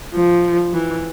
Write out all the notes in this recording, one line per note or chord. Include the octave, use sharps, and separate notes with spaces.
F3
E3